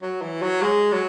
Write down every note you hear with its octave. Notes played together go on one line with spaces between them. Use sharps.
F#3
E3
F#3
G#3
F#3